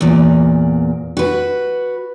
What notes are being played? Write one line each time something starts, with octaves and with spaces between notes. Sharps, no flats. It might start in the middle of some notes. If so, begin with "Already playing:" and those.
E2 A#2
F#4 B4